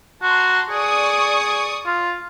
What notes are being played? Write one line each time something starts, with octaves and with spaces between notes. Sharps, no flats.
F#4 A5 A#5 C6
G#4 D5 C#6 D#6
F4